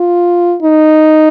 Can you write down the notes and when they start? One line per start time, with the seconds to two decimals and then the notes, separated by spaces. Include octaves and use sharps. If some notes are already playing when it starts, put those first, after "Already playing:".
Already playing: F4
0.63 D#4